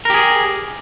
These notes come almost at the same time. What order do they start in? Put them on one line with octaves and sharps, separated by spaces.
A#4 G4 G#4